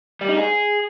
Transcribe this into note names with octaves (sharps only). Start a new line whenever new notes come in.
G3
D#4
G#4